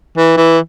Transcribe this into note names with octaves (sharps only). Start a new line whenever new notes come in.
E3
E3